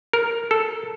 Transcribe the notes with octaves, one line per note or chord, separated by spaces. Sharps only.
A#4
A4